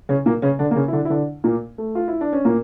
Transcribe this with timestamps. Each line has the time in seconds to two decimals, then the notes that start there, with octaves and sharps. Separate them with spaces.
0.09 C#3 C#4
0.26 A#2 A#3
0.42 C#3 C#4
0.59 D3 D4
0.71 A#3
0.76 C#3 C#4
0.88 E4
0.93 D3 D4
1.05 E4
1.10 D3 D4
1.44 A#2 A#3
1.78 A3
1.95 F4
2.08 E4
2.21 D4
2.33 C#4
2.45 A#2 A#3